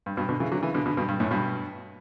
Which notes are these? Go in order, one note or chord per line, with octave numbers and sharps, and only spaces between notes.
G2
G2 B2
B2 D3
C#3 E3
D3 F#3
C#3 E3
B2 D3
B2 D3
G2 B2
G2
F#2 A2
G2 B2